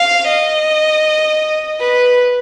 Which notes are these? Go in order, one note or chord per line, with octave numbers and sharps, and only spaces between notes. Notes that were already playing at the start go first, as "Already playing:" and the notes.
Already playing: F5
D#5
B4